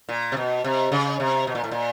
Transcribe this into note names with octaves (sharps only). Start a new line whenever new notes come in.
A#2
C3
B2
C3
C#3
C3
B2
A#2
A2
A#2